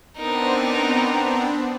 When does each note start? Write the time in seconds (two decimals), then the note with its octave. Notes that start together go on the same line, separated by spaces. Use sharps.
0.17 B3 C4 D4 D#4 A#4